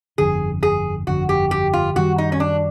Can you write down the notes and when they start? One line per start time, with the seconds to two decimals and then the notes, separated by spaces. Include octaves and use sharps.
0.18 G1 F2 D3 G#4
0.63 G#4
1.07 G1 F2 D3 F#4
1.29 G4
1.51 G4
1.73 F4
1.96 F#2 D#3 G3 F#4
2.18 D#4
2.32 C#4
2.40 D4